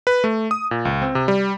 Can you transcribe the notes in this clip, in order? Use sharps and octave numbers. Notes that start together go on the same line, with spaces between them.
B4
A3
D#6
A#2
C#2
C4
C3
G3